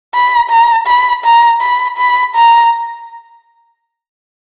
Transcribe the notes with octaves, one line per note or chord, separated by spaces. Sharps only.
B5
A#5
B5
A#5
B5
B5
A#5